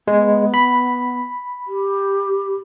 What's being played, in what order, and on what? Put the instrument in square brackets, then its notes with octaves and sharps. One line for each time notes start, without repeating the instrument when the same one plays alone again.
[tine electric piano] G#3 [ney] B3
[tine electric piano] B5
[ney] G4